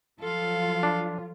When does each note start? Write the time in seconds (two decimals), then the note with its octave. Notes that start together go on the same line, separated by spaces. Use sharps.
0.20 F3 F#3 F4 A4 F5
0.83 D4